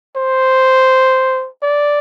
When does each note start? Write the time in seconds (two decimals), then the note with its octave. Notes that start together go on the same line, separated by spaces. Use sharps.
0.16 C5
1.62 D5